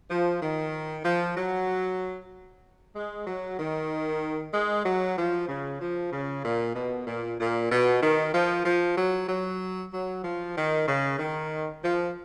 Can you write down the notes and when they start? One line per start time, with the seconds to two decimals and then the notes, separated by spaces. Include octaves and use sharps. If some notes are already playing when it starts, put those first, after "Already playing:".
0.10 F3
0.42 D#3
1.05 F3
1.36 F#3
2.96 G#3
3.27 F#3
3.59 D#3
4.53 G#3
4.86 F#3
5.18 F3
5.48 C#3
5.81 F3
6.12 C#3
6.45 A#2
6.75 B2
7.07 A#2
7.39 A#2
7.71 B2
8.02 D#3
8.34 F3
8.65 F3
8.98 F#3
9.29 F#3
9.93 F#3
10.24 F3
10.56 D#3
10.88 C#3
11.19 D#3
11.83 F3